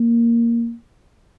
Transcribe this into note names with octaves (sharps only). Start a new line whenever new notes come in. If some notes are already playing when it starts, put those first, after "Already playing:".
Already playing: A#3